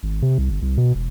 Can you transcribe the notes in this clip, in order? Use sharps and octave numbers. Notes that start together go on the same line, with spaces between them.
G#1
C3
C2
G1
C2
B2
E1